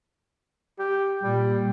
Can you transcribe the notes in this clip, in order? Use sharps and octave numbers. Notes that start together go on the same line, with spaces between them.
G4
A#2 G3